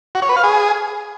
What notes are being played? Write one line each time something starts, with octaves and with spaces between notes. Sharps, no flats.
F#4
C#5
B4
F5
G#4